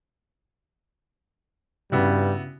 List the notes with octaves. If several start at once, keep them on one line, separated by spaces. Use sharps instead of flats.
G2 C#3 G3 B3 E4 F#4